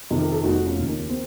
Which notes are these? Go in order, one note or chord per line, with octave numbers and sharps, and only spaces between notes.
F2 C3 D#3
A#4
A4
F1 D#4 F#4
C#4 F4
D#2 C#3 D#4
A#3 C#4
C4